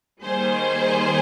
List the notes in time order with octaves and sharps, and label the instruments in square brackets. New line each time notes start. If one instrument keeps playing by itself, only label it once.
[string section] D#3 G3 A#3 G#4 C5